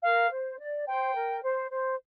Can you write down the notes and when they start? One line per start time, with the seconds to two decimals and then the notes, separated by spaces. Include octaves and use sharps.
0.02 A#4 F5
0.30 C5
0.59 D5
0.86 C5 G5
1.14 A#4
1.43 C5
1.70 C5